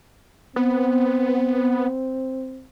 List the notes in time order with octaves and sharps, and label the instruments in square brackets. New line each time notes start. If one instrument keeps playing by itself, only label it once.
[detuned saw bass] B3 [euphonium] C4